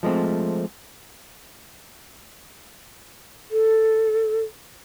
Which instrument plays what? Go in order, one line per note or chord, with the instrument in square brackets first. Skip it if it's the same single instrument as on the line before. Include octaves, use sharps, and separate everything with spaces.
[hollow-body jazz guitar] F3 G#3 A3 C4
[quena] A4